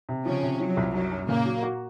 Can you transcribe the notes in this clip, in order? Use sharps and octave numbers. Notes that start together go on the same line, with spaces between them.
C3
C#3 F3 C#4
C3
F3 F#3
C2
F#2 F#3
F#2
A#2 C#3 A#3
F#3
F#4